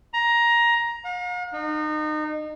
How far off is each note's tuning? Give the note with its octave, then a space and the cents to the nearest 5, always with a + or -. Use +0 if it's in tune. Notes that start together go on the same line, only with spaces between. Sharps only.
A#5 +15
F5 +45
D#4 -30